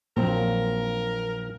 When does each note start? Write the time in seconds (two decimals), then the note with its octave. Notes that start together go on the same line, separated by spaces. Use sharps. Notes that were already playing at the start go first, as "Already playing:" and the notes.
0.17 A#1 F#3 A#3 C4 A#4